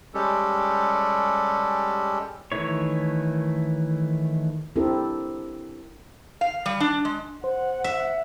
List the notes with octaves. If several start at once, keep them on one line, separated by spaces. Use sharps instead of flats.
G3 G#3 C#4 G4 A4
D#3 E3 A3 E4 C#5
C4 D4 E4 G4 A4 A#4
F5
G3
D4
G#3
C5 F#5
E5